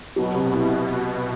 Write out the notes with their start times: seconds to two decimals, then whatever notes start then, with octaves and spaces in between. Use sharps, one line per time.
0.16 B2 F#3
0.35 C3
0.53 E4